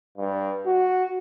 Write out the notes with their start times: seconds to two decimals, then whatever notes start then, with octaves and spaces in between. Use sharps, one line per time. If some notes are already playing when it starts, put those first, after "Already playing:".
0.18 G2
0.66 F#4